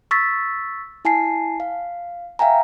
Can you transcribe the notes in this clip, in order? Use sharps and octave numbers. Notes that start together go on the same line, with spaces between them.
C#6 E6 A6 B6
E4 G#5 A5 C7
F5
E5 F5 G5 G#5 A#5